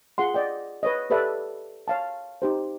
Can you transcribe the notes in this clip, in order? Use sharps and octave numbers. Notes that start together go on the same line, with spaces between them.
F4 G#4 F#5 C6
D5 D#5 G5
B4 C#5 D#5
G4 A4 B4 D5 E5
C#5 F5 A5
D#4 G4 C5